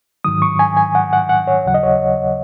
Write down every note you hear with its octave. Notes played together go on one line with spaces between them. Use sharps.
G#2 D#3 F#3 D#6
C#6
G#5
G#5
F#5
F#5
F#5
C#5
D#2 C#3 F#3 F#5
D#5
C#5